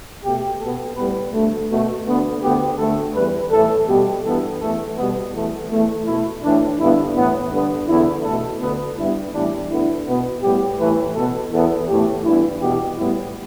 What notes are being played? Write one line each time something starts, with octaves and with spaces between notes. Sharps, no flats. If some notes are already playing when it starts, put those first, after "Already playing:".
B2 A3 G4
B2 B3 A4
A2 G3 B3 B4
D2 D3 A3
B2 A3
D2 D3 B3
D2 D3 B3 G4
D2 D3 A3 A4
E2 E3 G3 B4
A2 E3 A3 A4
B2 G3 B3 G4
G2 E3 B3 A4
E2 E3 A3 A4
B2 G3 B3
E2 E3 A3
E2 E3 A3
B2 A3 E4
A2 E3 A3 D4
G2 D3 B3 E4
A2 E3 B3
G2 D3 B3
E2 D3 B3 E4
B2 A3 A4
D2 D3 B3
G2 G3 B3 E4
A2 E3 G3 B3 D4
D2 D3 B3 E4
B2 B3
A2 G3 B3 G4
A2 E3 A3 B4
B2 B3 A4
E2 E3 B3 A4
A2 E3 A3 G4
G2 E3 B3 E4
E2 B2 B3 G4
A2 G3 B3 E4